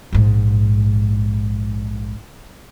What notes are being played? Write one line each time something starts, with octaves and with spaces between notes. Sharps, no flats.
A#1 G#2